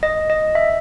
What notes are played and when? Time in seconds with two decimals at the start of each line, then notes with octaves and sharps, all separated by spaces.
0.03 D#5
0.30 D#5
0.55 E5